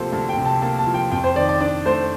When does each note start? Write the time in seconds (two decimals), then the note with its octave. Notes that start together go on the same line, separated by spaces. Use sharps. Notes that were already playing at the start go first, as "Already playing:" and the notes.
Already playing: D2 C3 F3 A#3 G4 A4 C5
0.12 D2 A5
0.29 G5
0.37 C3
0.45 A5
0.62 A#3 A5
0.78 A5
0.86 F3
0.94 G5
1.11 F2 G5
1.24 C5
1.35 D#3 D5
1.49 D5
1.61 D4 D5
1.86 A3 C5